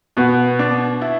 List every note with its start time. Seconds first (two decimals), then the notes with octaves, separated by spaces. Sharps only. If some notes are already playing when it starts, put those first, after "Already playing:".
0.17 B2 B3
0.59 D4
1.02 E4